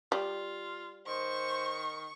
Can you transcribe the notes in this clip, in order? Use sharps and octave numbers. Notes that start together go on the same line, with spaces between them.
G3 F4
D#3 C5 C#6